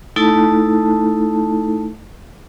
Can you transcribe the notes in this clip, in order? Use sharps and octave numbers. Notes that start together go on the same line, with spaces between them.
A3 D#4 E4 A4 A5